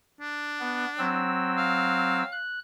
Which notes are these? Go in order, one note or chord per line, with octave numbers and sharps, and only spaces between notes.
D4
B3
F#3 C4 E6
F5
F#6